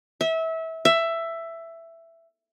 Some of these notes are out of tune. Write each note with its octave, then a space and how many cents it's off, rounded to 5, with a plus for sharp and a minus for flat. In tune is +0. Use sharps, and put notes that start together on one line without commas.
E5 -25
E5 +10